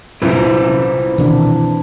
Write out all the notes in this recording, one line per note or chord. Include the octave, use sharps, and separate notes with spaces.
C2 F#2 A#2 E4 B4 C5
B2 D#3 E3 A#3 C4 D4